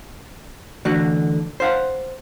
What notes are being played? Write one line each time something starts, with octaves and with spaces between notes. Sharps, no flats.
D3 E3 A3 F#4
C5 F5 F#5